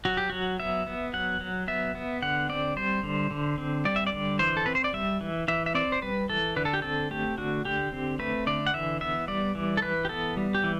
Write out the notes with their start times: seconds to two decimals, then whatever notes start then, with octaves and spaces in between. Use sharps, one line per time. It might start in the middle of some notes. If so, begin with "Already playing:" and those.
0.05 F#3 F#4
0.17 G4
0.30 F#3 F#4
0.60 B3 E5
0.86 B3
1.14 F#3 F#5
1.41 F#3
1.68 B3 E5
1.95 B3
2.22 D3 F#5
2.49 C4 D5
2.76 G3 C5
3.03 D3
3.31 D3
3.58 C4
3.85 G3 D5
3.96 E5
4.07 D5
4.13 D3
4.39 E3 C5
4.57 A4
4.66 C4 B4
4.75 C5
4.84 D5
4.93 G3 E5
5.21 E3
5.48 E3 E5
5.66 E5
5.75 C4 D5
5.92 C5
6.02 G3 B4
6.29 E3 A4
6.56 D3 B4
6.65 A4
6.74 G4
6.82 C4 A4
7.11 A3 G4
7.38 D3 F#4
7.65 D3 G4
7.92 C4
8.19 A3 B4
8.47 D3 D5
8.67 F#5
8.74 E3 E5
9.01 B3 E5
9.28 G3 D5
9.55 E3
9.77 A4
9.82 E3 B4
10.05 G4
10.09 B3 A4
10.37 G3
10.55 G4
10.64 E3